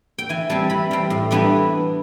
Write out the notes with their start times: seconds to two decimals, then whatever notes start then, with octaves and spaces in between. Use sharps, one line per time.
0.18 G5
0.29 E3 G#5
0.50 G3 C4 A5
0.70 E3 B5
0.91 G3 C4
1.10 A2
1.31 E3 G3 B3 D4